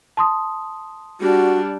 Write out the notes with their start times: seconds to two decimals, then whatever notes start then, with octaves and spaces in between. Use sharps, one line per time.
0.17 A5 C6 D#6
1.20 G3 D4 F#4